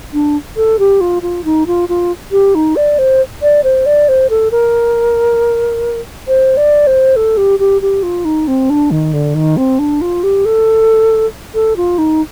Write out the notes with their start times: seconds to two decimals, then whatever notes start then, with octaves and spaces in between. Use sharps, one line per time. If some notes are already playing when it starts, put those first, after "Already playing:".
0.13 D4
0.57 A4
0.79 G4
1.01 F4
1.23 F4
1.45 D#4
1.67 F4
1.89 F4
2.32 G4
2.55 D#4
2.76 D5
2.99 C5
3.42 D5
3.64 C5
3.86 D5
4.09 C5
4.30 A4
4.51 A#4
6.28 C5
6.57 D5
6.87 C5
7.16 A4
7.37 G4
7.59 G4
7.82 G4
8.03 F4
8.25 D#4
8.48 C4
8.70 D4
8.91 D#3
9.13 D3
9.35 D#3
9.57 C4
9.79 D4
10.01 F4
10.23 G4
10.45 A4
11.55 A4
11.77 F4
11.98 D#4